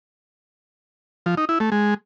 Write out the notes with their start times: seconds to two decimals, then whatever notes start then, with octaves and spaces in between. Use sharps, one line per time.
1.26 F3
1.37 D#4
1.49 E4
1.60 A3
1.72 G#3